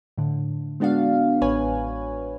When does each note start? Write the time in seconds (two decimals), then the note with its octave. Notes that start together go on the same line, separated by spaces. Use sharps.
0.18 A2 D3
0.80 G#3 B3 D4 F#4 F5
1.41 A1 B4 C#5 G#5